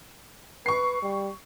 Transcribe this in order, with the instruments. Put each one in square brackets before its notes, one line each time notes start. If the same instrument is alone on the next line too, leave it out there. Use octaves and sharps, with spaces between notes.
[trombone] B4 [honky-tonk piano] C#6 C7
[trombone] G3